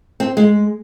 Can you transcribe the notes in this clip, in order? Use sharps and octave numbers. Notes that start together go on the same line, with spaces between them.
C4
G#3